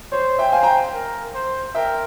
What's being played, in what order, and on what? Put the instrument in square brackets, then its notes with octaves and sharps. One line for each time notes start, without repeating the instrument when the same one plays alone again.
[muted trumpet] C5 [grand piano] C#5
[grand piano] E5 G5
[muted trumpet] C5 [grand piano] F5 G#5
[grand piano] G5 A#5
[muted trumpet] A#4
C5
[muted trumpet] A#4 [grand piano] E5 G5